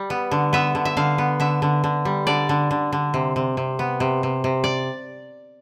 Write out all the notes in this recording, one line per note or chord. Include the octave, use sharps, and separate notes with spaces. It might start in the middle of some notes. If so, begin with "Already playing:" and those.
Already playing: G3
B3
D3
B3 E5
D3
E5
D3 F5
B3
D3 E5
D3
D3
G3
D3 D5
D3
D3
D3
C3
C3
C3
B3
C3
C3
C3
D5